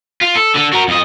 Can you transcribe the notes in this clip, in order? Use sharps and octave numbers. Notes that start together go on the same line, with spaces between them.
F4
A4
D3 A4
F#4 A#4
F2 D#5